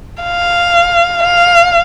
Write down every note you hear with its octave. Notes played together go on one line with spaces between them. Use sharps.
F5
F5